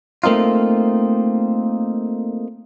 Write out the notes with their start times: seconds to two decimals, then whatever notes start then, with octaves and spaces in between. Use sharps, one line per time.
0.24 A3 A#3 C4 D#4 F4